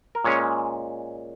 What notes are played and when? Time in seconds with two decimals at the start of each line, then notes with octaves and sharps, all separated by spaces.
0.15 A#4
0.24 A#2 G#3 C#4 C#5